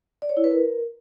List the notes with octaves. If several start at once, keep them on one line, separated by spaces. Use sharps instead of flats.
D5
C#5
E4
B4
A#4